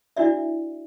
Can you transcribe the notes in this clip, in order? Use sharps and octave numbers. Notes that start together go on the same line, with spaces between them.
D4 E4 F#4 D5 E5